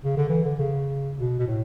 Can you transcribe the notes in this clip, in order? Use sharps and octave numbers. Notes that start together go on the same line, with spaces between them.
C#3
D3
E3
D3
C#3
B2
B2
A2